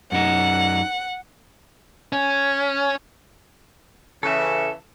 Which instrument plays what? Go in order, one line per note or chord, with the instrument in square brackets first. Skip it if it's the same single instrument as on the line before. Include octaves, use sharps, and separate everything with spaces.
[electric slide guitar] F#2 D#4 [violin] F#5
[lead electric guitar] C#4
[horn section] C#3 E3 [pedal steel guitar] A4 E5